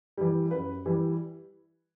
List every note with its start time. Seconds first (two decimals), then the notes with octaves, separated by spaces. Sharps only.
0.18 E3 G3
0.51 F#2 B4
0.86 E3 G3